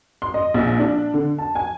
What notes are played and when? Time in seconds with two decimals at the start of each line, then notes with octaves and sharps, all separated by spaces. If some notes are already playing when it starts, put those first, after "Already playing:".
0.22 C6
0.34 D#5
0.54 A#1
0.79 D4
1.14 D3
1.38 A5
1.55 G#5